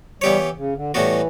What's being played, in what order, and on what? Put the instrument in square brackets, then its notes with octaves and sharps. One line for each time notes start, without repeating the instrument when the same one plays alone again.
[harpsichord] E3 B3 E4 G4 C#5 [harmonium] G3
[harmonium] C#3
D3
[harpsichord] A2 G3 B3 F#4 [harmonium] E3